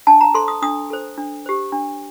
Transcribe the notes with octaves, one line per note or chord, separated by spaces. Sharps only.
D4 A5
A#5
A4 C5 C6
D#6
D4 D#6
A4 C5
D4
G4 C5
D4